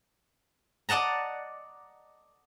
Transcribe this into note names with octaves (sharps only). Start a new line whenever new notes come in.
D5 D#5 F#5 A5 A#5